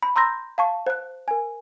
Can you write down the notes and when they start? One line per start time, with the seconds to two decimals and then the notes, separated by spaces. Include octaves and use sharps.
0.02 B5
0.16 A#5 C6 E6 G6 A#6
0.58 F5 A5 C#6
0.87 C5 F#6
1.28 A#4 G#5